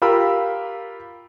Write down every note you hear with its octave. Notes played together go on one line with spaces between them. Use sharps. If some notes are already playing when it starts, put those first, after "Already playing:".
F4 G4 A#4 B5 E6